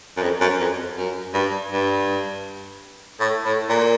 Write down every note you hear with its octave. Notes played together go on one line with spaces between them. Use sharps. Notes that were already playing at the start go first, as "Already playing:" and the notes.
F#2
F2
F#2
F2
F#2
G2
G2
A2
A2
A#2